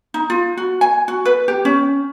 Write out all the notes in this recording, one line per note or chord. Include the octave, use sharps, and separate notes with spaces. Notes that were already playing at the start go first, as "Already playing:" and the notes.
D#4
F4
F#4
G#5
F#4
B4
G4
C#4